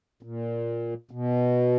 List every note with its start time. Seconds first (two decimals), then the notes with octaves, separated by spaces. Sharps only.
0.23 A#2
1.11 B2